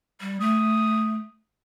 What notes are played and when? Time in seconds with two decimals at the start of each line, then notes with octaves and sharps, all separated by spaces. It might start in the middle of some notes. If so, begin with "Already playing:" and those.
0.21 G3
0.40 A3 D#6